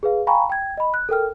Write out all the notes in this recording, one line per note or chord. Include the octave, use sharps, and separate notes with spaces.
G#4 B4 F5
F5 G5 G#5 A#5 B5 C#6
G5 G#6
D#5 B5
F#6
A4 A#4 G5 F6